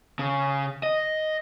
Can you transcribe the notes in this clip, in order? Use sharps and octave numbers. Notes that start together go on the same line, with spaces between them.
C#3
D#5